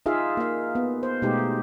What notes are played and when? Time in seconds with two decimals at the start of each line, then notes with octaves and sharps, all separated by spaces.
0.06 D#4 F4 G#4 E5 F5
0.37 A#3 F5
0.75 B3
1.03 C5
1.22 B2 G#3 A3 D#4 G4